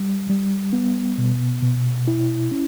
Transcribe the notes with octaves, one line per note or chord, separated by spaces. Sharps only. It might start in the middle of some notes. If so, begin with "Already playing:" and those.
Already playing: G3
G3
B3
B2
B2
E4
C#4